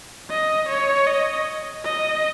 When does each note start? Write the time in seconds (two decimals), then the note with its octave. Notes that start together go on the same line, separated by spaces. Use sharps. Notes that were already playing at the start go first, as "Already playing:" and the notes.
0.30 D#5
0.69 C#5
1.07 D#5
1.84 D#5